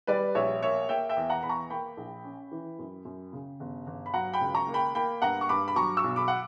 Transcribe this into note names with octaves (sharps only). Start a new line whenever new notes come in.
G3 B4 D5
A#1 C#5 E5
A#3 C#5 E5
A#3 E5 G5
E5 G5
E2
F#5 A#5
E2 B5
A#5 C#6
A#3 G5 B5
A#1
C#4
E3
F#2
F#2
C#3
G1
G1
B5
F#3 F#5 A#5
G5 B5
C#2
A#5 C#6
A#3
G5 B5
A#3 G5 B5
G2 F#5 A#5
C#6
G2 B5 D6
B5
F#3 A#5 C#6
C#6 E6
B1
B5 D6
F#5